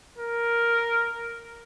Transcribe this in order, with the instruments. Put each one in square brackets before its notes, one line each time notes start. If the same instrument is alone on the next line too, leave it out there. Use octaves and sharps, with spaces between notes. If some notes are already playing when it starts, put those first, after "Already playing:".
[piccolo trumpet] A#4